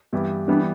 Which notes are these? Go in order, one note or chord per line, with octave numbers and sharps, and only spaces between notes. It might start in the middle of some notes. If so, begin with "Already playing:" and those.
G2 E3 B3 E4 G4
E3 G3 B3 D4